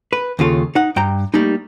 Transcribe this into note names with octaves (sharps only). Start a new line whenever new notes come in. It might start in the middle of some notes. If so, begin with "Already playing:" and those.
B4
D#2 C#3 F4 A4
D#4 F#5
G2 G5 A#5
G3 A3 A#3 D#4